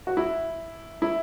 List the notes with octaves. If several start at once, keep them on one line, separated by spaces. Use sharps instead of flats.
F#4
E4
E4